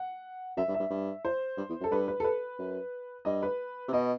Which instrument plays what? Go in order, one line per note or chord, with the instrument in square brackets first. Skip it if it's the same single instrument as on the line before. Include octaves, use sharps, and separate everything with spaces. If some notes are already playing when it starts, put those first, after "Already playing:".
Already playing: [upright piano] F#5
[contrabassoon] F#2 [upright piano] E5
[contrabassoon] G2
[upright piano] E5
[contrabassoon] G2
G2
[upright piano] C5
[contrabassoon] G2
E2
F#2
[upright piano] A4
[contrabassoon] G2 [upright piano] B4
[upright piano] B4
A4
B4
[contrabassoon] F#2
[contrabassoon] G2 [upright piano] D#5
[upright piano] B4
[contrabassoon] C3
[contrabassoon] B2 [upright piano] D#5